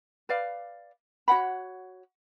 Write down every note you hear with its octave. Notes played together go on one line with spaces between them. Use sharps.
B4 D5 F5
F#4 C#5 F#5 B5